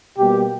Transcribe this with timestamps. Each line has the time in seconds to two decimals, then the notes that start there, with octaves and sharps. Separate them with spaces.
0.18 B2 G3 A#3 G4